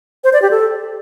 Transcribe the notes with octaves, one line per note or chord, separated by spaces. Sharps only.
C5
D5
G4
A4